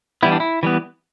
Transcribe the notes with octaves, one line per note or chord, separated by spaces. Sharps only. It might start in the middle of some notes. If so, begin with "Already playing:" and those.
E3 G3 B3 E4
D4
E4
E3 G3 B3